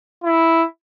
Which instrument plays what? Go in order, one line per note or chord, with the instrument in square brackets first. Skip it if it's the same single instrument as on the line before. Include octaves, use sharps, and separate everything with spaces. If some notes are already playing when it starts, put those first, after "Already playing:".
[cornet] E4